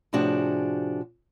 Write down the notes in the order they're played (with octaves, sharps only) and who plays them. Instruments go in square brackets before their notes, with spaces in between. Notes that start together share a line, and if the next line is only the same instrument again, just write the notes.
[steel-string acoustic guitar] A2 C3 F3 D4 F#4 G#4